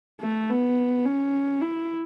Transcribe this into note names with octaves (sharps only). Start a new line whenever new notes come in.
A3
B3
C#4
E4